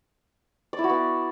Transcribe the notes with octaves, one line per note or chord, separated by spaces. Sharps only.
D5
E4
F#4
B3